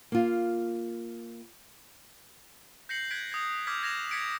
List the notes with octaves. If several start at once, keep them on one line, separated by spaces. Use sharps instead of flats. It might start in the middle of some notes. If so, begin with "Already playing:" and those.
A#3 F4
G6 A#6 C7 C#7 F#7
F#6 G#6 B6 D7
D#6 G6 G#6
D6 E6 F6 G6 G#6 B6
G#6 A#6 E7 F7
G#6 B6 C#7 D7